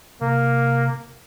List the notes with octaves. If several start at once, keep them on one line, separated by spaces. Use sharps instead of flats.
C3 A#3